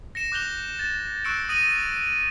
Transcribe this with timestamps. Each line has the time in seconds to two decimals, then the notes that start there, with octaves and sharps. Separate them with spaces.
0.15 A#6 C#7 E7
0.32 D6 F#6 G6 F7 G7
0.79 A6 E7
1.24 C#6 E6 F#6 C#7 D7 E7
1.49 D#6 A#6 D#7 F#7